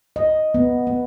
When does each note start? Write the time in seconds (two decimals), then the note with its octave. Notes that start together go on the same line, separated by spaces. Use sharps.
0.16 D#5
0.54 B3
0.87 B3